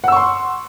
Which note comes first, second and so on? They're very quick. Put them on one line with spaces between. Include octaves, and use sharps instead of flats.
F#5 E6 C#6 C6